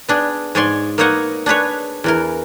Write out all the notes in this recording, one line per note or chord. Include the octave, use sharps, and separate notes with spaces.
B3 D4 G#4
G#2 G#4 C#5 D5 C6
A#3 B3 D#4 C#5 D#5 F#5
D4 G#4 B4 C#5
E2 E3 A#4